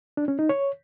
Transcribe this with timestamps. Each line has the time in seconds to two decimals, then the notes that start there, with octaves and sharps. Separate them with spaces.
0.17 D4
0.28 C#4
0.39 D#4
0.49 C#5